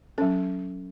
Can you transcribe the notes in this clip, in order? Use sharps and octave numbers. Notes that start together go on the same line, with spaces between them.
F#3 C#4 A4